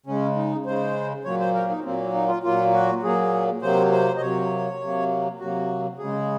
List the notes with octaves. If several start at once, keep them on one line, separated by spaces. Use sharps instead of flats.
C#3 G#3 C#4
D#4
C#3 G#3 C5
A#2 F#3 A#3 C#5
C5
A#4
D#4
A#2 F#3 A#3 C4
D#4
F4
A#2 F#3 A#3 F4
F#4
A#2 F#3 A#3 G#4
C3 F#3 A#3 C5
C5
D#5
C3 F#3 A#3 C#5
C3 F#3 A#3
C3 F#3 A#3 F#4
C#3 G#3 G#4